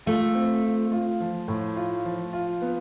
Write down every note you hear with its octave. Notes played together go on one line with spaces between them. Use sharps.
A3 F4
C4
F4
F4
F3
A2
F4
F3
F4
B3